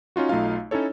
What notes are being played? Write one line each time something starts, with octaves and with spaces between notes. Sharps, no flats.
C#4 D#4 F4 F#4
B1 A3 D#4 F4 F5
C#4 D#4 E4 A4 C#5